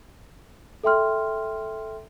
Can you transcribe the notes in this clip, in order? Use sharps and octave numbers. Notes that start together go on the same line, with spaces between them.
A4 E5 G5 C6 F6